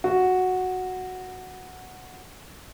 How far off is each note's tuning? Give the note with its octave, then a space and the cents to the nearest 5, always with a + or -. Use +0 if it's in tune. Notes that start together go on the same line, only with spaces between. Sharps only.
F#4 -5